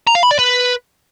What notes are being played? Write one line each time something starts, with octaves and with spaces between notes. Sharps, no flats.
A#5
F5
B5
D5
B4